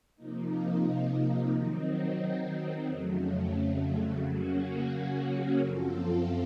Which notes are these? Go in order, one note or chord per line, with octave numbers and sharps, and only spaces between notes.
C3 F3 A#3 D#4
D#3 F#3 C4 D#4
F2 C#3 F#3 A3
C#3 F#3 A#3 C#4 F#4
F#2 F3 C4 F4 A4